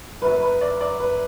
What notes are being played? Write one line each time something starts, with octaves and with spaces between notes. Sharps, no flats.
F#1 F#2 F#3 B4
B4
D5
D5
B4